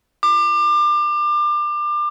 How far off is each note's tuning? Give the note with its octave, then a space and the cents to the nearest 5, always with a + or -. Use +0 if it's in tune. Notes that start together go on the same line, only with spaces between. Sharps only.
D6 +30